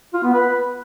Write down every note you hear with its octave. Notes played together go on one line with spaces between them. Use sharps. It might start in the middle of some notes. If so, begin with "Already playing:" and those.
F4
B3
B4